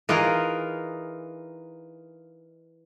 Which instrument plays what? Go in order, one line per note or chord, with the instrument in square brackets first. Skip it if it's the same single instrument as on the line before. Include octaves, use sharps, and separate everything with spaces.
[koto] E3 D#4 F4 G#4 A#4